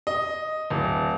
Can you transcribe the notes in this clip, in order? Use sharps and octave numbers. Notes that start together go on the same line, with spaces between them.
D#5
D1